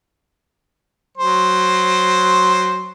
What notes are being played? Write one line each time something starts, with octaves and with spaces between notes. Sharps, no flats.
F#3 C5